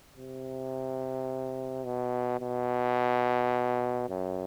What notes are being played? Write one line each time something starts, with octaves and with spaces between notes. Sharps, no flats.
C3
B2
B2
F#2